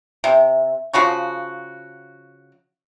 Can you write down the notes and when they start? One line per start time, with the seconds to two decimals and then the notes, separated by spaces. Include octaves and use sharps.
0.24 C3
0.93 C#3 F3 F#4 C#6